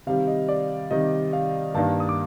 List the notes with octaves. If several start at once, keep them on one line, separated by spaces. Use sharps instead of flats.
C3 D#3 G3 F5
D#5
D5
C3 D#3 G3 D#5
F5
G2 D#3 A#3 D4 A5
D#6
D6